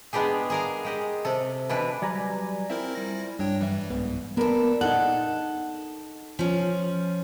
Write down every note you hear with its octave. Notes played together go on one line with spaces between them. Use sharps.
G#3 B3 D4 G4 G#4
G#4 A#4 F5
G#3 G4 D#5
C3 A4
B2 E3 D4 B4
F#3 G3 B4 D5 G#5 A#5
C4 E4 F4 A#4 C5 E5
G3 E4 A#6
G2 D4 C#5 G5
F#2 E3 G3 E5
C2 G#2 B3
B3 D4 A4 A#4
D#4 A4 F#5
F3 C#4